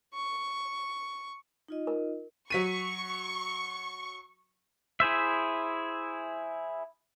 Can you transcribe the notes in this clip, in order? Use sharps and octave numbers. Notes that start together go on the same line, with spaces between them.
C#6
D#4 F4 D#5
A#4
F#3 C#6 B6 D#7
E4 G#4 C5 E5